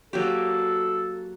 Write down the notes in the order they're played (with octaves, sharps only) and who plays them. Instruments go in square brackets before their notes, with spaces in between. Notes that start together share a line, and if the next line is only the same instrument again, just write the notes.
[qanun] F#3 A#3 G4 [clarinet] A4